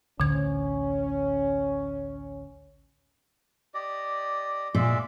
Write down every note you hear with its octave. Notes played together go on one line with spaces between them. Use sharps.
A1 D2 D3 C#4 G#6
G4 D5 D#5
A#2 G#3 D5 E5